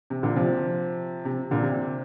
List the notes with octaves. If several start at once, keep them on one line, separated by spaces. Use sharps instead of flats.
C3
A#2 D3
C3 F3
C3
A#2 D3
C3